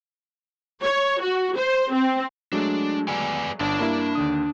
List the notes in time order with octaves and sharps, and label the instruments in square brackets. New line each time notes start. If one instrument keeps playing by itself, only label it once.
[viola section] C#5
F#4
C5
C4
[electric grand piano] F#3 G#3 A3 [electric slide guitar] D4
[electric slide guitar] B4 D5 G#5
[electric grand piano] G1 [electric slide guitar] D4 A5
[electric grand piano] G2 A#3 E4
D#2 D3 D#6